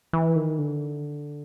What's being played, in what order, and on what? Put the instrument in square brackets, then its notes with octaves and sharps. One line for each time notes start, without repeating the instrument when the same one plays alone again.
[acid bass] E3
D#3
D3